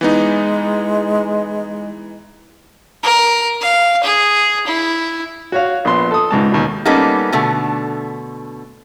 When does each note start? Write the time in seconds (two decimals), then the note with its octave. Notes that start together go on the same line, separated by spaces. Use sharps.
0.01 E3 G#3 B3 D#4
3.03 A#4
3.61 F5
4.03 G#4
4.67 E4
5.52 F#4 C#5 F5
5.85 A#1 B3 C6
6.11 A4 D#6
6.31 C#2 G#2 A5
6.52 D#2 B2
6.85 G3 A#3 B3 C#4 D#4 A4
7.32 B2 D3 A3